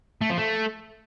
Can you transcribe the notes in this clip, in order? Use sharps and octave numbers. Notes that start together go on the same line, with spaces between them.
A3
F3
A3